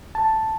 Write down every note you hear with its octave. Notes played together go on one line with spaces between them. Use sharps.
A5